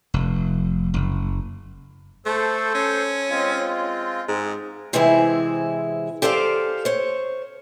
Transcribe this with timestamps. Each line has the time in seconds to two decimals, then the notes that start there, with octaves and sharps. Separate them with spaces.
0.14 F1
0.94 F#1
2.26 A3 A4 C5
2.75 C#4
3.30 G#3 C4 F4
4.28 G#2 C4
4.93 C3 E3 G#3 C4 E4 G#4
6.22 G4 A4 C5 D5 F5
6.85 C5 C#5